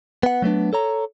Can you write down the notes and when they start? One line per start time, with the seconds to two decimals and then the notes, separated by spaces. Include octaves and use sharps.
0.23 B3 F#5
0.42 F#3 A3 B3 D4
0.73 A4 C#5 A#5